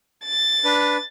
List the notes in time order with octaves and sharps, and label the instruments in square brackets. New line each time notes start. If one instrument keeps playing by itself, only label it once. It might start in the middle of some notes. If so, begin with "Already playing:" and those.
[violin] A6
[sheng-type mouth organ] D4 B4